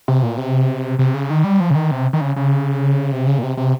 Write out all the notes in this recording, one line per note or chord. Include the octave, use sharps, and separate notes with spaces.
C3
A#2
C3
C3
C#3
D#3
G3
F3
C#3
D#3
C3
D#3
C#3
C#3
C3
C#3
A#2
C3
C3